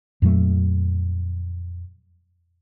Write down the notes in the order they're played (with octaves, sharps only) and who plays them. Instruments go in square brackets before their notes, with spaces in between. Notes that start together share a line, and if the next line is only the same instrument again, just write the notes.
[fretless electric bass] F2 A#2 F#3 A3